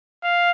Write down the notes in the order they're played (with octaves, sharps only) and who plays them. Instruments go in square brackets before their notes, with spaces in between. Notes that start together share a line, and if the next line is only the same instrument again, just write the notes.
[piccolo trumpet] F5